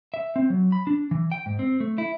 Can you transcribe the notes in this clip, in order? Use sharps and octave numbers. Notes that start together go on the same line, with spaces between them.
E5
C4
F#3
B5
D4
E3
G5
G#2
C4
A3
E4